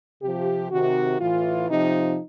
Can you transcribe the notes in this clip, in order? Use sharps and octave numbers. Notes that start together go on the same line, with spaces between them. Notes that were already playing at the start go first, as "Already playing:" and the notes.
C3 F3 G4
C3 D#3 F#4
A2 E3 F4
C3 F3 D#4